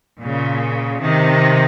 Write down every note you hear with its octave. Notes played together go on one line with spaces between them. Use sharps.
A#2 C#3
C3 D#3